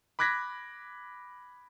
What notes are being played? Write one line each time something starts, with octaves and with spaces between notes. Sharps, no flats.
B5 D6 F#6 G#6 A#6 B6